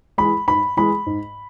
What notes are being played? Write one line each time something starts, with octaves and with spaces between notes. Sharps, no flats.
E3 G#3 B5
G#2 B5
E3 G#3 B5
G#2